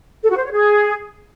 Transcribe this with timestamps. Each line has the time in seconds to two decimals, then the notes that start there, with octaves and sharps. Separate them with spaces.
0.22 A4
0.30 F#4
0.37 C5
0.44 C#5
0.52 G#4